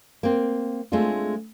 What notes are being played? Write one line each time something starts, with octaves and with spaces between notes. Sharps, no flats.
A#3 C4
G#3 A3 C4 D4 F4